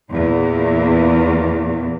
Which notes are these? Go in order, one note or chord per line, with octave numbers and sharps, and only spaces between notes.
E2 A#2